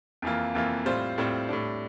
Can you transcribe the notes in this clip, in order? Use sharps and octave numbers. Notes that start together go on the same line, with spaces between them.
F2 E3 A#3 F4
F2 E3 A#3 F4
A2 G3 C4 F4 C5
A2 G3 C4 F4 C5
A2 G3 D4